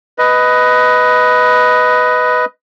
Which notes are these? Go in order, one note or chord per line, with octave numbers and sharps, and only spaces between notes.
B4 D#5